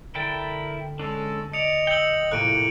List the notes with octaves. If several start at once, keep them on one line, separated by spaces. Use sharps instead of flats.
D3 E4 A#4 G5 A5
G#3 C#4 D4 A4
D5 D#5 C#7 F7
G5 E6 C#7 F#7
A#1 A2 C3 A#3 F#6 D7 D#7